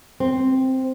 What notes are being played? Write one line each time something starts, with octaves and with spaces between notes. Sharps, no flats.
C4